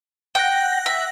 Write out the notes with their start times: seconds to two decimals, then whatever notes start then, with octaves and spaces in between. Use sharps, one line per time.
0.35 F#5 G5 F#6 A#6
0.86 E5